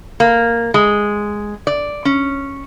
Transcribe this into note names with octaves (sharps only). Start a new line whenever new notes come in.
A#3
G#3
D5
C#4